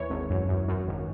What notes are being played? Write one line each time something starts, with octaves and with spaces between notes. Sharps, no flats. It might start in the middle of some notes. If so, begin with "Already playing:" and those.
Already playing: D#2 E3 C#5
G#1
F#2
F#2
F#2
G#1